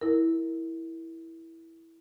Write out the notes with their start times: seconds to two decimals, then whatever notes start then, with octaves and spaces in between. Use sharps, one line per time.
0.01 E4 A#4